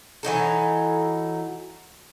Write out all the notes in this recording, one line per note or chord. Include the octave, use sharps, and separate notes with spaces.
E3 F#3 D#4 A4